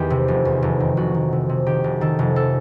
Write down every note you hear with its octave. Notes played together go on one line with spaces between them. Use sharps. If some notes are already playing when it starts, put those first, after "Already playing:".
Already playing: E2 D#3 G4
C3
F1
E2
F1
D#3
F1 F#4
D#3
C3
C3
D#3 G4
F1
D#3 A4
F1
A4